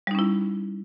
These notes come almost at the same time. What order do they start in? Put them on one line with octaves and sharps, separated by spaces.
G3 D#4 C#4 E4